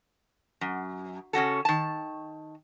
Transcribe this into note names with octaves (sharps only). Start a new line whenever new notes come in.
F#2
C#3 C#4 F#4 A4
D#3 A5